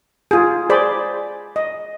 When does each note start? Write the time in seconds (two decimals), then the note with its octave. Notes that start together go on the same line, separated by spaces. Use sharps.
0.31 F4 G#4
0.70 G#4 C5 D5 B5
1.56 D#5